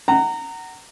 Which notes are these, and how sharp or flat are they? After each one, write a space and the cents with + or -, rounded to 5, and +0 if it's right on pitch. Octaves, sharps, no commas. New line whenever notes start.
F#5 +20 A#5 -20